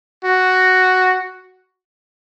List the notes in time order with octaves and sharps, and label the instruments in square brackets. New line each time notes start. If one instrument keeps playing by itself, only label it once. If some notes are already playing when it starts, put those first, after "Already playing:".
[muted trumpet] F#4